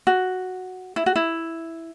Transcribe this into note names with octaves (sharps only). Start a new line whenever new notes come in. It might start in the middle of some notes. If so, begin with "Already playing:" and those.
F#4
E4
F#4
E4